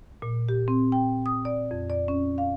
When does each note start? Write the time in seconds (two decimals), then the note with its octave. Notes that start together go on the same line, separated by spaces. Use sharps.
0.22 A#2
0.49 G4
0.68 C4
0.92 G5
1.26 D#6
1.45 D5
1.71 F2
1.90 D5
2.08 C#4
2.38 F5